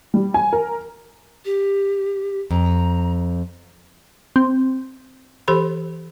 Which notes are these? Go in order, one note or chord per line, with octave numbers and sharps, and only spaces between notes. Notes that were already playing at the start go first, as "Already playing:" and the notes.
G3
G#5
A#4
G4
F2 A#5
C4
E3 G4 A4 C5 B5